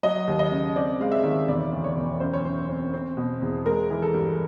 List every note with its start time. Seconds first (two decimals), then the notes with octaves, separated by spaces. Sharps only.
0.03 F#3 D#5
0.27 D#2
0.39 D#5
0.51 C#3
0.75 C4 D5
1.00 G#3 F5
1.12 E5
1.23 D#3
1.48 E1 D5
1.72 D2
1.84 C#5
1.97 E1
2.20 F#2 C5
2.34 C#5
2.45 F#2 C5
2.69 C4
2.94 C4
3.17 B2
3.42 E2
3.66 G#3 A#4
3.90 E3
4.02 A4
4.14 G2